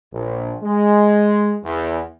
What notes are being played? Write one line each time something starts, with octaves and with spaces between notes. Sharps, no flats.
A#1
G#3
E2